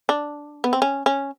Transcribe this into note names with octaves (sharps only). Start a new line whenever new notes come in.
D4
B3
C4
C#4
C#4